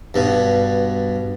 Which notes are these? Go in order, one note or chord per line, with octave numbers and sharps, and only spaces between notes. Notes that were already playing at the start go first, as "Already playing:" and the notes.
G2 B2